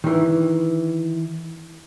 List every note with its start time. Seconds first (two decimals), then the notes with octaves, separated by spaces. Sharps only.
0.04 D#3 E3